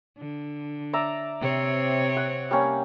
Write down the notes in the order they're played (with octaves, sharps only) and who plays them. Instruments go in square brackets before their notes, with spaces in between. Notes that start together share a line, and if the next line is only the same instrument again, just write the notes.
[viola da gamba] D3
[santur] D5 E5 A#5
[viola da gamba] C3 C4 C#5
[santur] F#5
G3 A#3 C#4